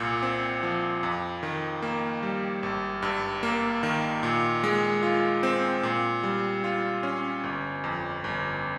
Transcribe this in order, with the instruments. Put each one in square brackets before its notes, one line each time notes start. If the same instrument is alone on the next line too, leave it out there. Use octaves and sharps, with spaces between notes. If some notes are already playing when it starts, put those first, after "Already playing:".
Already playing: [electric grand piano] C2 A#2
C4
F3
F2
D#3
A#3
G3
G#1
G2
A#3
D#3
A#2
G#3
F4
C4
A#2
G3
F4
C#4
G1
F2
G1